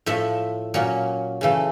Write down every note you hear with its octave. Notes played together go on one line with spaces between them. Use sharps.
A2 F3 A3 E5
A#2 F#3 A#3 C#4
C#3 E3 A3